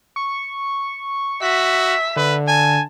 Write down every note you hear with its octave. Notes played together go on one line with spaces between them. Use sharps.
C#6
F#4 E5 B6
D3 B4
G#5 A5